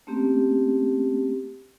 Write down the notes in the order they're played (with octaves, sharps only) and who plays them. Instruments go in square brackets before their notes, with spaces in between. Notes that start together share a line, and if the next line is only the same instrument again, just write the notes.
[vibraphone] A3 A#3 C4 C#4 G4